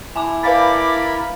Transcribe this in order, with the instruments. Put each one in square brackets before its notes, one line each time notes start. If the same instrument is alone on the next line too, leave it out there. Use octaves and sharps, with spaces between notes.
[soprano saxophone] E4 [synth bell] G#5 A5 D6
[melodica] A#4 B5 [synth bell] B4 F5 A6 [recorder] D6